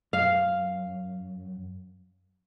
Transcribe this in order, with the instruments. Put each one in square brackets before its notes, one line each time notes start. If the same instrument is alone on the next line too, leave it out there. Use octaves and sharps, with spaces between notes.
[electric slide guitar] F#2 [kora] F5